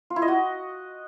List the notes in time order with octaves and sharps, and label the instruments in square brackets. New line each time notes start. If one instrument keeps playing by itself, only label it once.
[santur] F4
E4
D#5
F#4